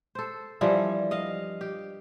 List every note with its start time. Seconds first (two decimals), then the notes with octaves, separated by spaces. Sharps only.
0.15 A4 C5
0.61 G2 E3 F3 G3
1.11 D#5 F5
1.61 G4